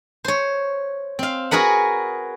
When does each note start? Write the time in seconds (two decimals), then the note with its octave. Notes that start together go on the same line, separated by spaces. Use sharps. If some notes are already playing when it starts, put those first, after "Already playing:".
0.25 C5 C#5
1.19 C4 F5
1.51 F#4 G#4 A#4 B4 F#5